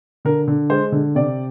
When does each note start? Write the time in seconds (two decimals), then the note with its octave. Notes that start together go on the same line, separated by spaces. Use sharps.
0.25 D3 A#4
0.48 D3
0.70 G#3 C5
0.92 D3
1.15 C3 D5